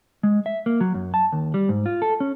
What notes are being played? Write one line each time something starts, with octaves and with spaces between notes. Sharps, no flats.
G#3
E5
A#3
F#3
F#2
A5
D#2
G3
G#2
F4
A4
C#4